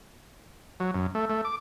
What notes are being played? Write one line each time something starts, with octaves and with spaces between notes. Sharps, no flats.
F#3
F#2
A3
A3
D6